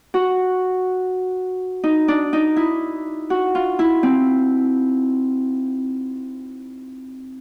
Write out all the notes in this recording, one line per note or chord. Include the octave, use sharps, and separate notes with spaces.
F#4
D#4
D4
D#4
E4
F#4
F4
E4
C4